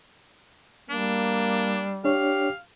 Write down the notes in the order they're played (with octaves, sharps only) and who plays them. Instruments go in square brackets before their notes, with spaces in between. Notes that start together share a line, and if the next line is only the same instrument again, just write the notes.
[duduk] G3 [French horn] A#3 [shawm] D4
[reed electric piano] D4 C#5 [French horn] G4 [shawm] F5